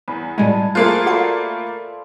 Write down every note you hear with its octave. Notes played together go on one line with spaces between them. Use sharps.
E2 B5
A2 G3 G#3 G#5 A5
A3 A#3 F4 G#4 C5 F5 F#6
F#4 A4 D5 F5 B5 C7